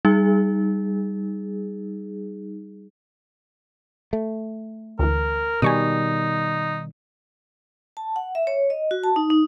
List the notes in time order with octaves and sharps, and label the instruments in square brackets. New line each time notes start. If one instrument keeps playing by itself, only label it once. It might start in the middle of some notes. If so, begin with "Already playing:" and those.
[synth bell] G3 D#4 G#4
[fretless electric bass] A3
[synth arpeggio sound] D2 E3 [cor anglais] A#4
[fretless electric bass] B2 D#3 G3 [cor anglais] D#4 [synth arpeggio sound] G#5 C#6 D#6
[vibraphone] A5
F#5
E5
C#5
D#5
F#4
A5
D#4
D#4